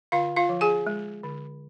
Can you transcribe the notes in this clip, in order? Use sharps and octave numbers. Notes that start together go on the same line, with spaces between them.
D3 F4 F5
F4 F5
F3
G#4 G#5
G#3
D3